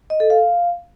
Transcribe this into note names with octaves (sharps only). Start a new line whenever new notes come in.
D#5
A4
F5